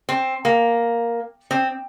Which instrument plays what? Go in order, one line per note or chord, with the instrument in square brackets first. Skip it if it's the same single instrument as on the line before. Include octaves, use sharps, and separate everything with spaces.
[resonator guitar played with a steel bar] C4
A#3
C4